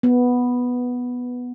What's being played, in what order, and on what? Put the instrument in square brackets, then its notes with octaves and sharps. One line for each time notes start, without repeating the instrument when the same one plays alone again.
[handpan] B3